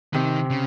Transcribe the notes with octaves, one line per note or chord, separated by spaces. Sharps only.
C3 D#3
C#3